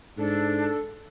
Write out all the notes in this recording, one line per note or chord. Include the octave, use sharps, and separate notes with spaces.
G#2 D4 A4